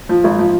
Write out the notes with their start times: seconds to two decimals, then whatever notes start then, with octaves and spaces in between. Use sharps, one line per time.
0.09 F3
0.24 G#1
0.39 F3